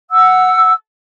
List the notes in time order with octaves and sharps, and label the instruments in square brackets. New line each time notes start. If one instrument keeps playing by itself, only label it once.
[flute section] F#5 E6